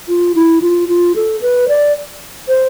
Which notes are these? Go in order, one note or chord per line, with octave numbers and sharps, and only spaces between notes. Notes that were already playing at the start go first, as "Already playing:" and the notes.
F4
E4
F4
F4
A4
B4
D5
C5